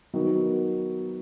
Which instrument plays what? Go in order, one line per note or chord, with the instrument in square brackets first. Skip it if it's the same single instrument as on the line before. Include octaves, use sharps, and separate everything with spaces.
[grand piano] D#3 F#3 B3 D#4 F#4